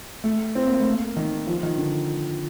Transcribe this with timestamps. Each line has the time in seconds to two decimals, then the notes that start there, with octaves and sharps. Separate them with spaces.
0.24 A3
0.55 C4
0.67 A#3
0.80 A3
0.93 A#3
1.17 D#3
1.47 F3
1.63 D#3
1.78 D3